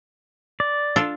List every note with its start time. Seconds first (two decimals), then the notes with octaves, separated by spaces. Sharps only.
0.60 D5
0.96 D4 F4 A4